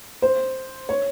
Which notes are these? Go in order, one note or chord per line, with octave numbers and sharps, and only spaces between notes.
C5
C#5